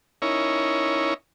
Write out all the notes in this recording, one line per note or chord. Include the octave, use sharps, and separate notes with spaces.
C#4 D#4 E4 A#4 C#5